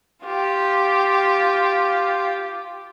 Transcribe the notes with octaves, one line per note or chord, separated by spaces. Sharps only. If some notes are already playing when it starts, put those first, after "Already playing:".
F4 G4